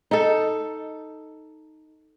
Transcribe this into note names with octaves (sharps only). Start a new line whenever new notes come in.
D#4 A4